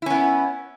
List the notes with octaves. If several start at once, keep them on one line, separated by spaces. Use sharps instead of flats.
B3 C#4 E4